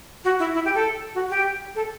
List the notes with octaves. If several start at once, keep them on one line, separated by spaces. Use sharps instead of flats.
F#4
E4
E4
G4
A4
F#4
G4
A4